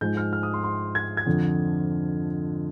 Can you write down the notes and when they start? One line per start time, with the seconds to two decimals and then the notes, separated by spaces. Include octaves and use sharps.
0.01 G#2 F3 G#3 G6
0.17 F6
0.33 F6
0.43 D#6
0.54 C6
0.64 C6
0.95 G#6
1.17 G#6
1.27 F2 D3 F3